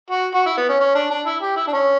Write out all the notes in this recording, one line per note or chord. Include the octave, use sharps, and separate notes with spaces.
F#4
F#4
E4
B3
C#4
C#4
D4
D4
E4
G4
E4
D4
C#4